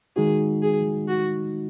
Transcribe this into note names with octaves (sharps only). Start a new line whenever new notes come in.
D#3 G#3 D#4 F#4 G#4
G#4
F#4